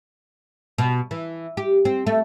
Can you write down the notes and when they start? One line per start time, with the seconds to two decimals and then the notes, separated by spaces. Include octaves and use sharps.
0.78 B2
1.11 E3
1.57 G4
1.85 C4
2.07 A3